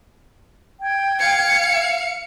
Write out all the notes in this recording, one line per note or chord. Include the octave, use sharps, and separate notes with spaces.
G5 G#6
F5 C#7